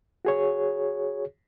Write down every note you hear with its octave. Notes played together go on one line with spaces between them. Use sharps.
F#4 G#4 C#5